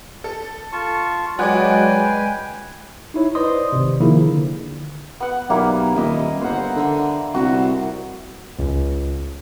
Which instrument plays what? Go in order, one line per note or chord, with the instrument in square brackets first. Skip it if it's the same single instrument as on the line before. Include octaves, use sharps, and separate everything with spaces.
[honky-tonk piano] A4
[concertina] F4 A5 C#6
[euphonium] F#3 [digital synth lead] G#3 [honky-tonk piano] F#4 D5 [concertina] B4 G5 G#5
[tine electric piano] D#4 E4 C#5
B4 C5 D5 D#5 C6 D#6
G#1 C3
C3 D#3 F3 A#3 E4 G#4
D3
[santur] B3 F#5
[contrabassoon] B1 [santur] G3 A#3 E4
[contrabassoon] D#1 [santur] E4 D#5
[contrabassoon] G1 [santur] C5 F#5
[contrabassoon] D3
[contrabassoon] C2 [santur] F#4
[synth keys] C#2